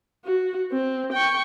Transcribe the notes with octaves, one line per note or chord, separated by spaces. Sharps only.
F#4
C4
G5 C#6